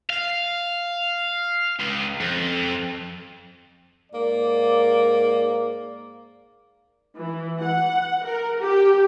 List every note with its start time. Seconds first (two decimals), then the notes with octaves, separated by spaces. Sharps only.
0.10 F5
1.79 C#2
2.20 F2
4.12 G#2 A#3 D5
7.18 E3
7.63 F#5
8.25 A#4
8.62 G4